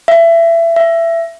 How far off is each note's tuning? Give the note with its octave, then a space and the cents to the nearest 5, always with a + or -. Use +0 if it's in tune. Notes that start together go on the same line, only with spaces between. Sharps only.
E5 +25
E5 +20